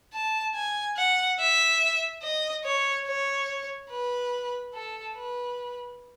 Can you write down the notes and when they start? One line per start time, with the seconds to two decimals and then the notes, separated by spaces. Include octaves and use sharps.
0.13 A5
0.54 G#5
0.97 F#5
1.39 E5
2.22 D#5
2.64 C#5
3.06 C#5
3.90 B4
4.74 A4
5.16 B4